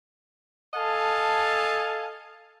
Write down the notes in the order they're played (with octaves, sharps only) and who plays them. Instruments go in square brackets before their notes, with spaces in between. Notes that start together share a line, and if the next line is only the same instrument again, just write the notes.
[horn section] A4 D#5 F5 G#5 A5